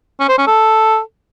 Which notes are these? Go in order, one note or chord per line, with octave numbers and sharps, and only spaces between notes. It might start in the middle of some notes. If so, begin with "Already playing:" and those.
C#4
C5
C#4
A4